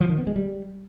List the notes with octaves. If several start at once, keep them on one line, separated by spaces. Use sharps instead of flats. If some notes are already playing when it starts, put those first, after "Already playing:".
F3
D#3
B3
G#3
G3